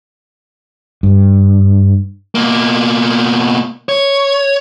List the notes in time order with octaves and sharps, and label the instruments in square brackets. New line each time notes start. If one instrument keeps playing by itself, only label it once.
[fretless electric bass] G2
[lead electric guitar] B2 A#3
C#5